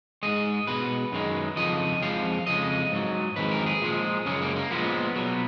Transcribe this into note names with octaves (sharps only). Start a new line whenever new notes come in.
G#2 F3 G#3 D#5
B2 G#3 B4
F#2 D#3 G#3
F2 C#3 F3 D#5
F2 F3 G#3 F5
F2 C#3 G#3 D#5
G#2 F#3
F2 D#3 G#3 B4
A#4
G#4
A#2 F3 G#3
F#2 C#3 G#3 C#4
A#3
A#3
A#2 F3 G#3 B3
B2 F#3